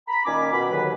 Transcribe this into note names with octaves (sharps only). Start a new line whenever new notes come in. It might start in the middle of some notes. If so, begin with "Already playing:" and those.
A#5 B5
A#2 D#3 C#4 G#5 D6
B2 D#3 C#4 B5
D#2 B2 D3 D#3 F#3 B4